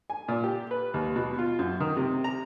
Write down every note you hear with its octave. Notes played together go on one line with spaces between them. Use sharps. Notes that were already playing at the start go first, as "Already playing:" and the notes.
G#5
A#2
G4
B4
D#2
B2
F4
F#2
D#3
C3
A#5